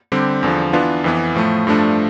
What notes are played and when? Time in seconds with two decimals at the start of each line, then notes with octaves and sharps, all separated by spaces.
0.12 D3 G3 C4 G4
0.43 E2 D3 F3
0.73 E3 B3 D4 F4
1.04 F2 E3 B3
1.36 A2 F3 A3
1.67 G2 F3 A3 D4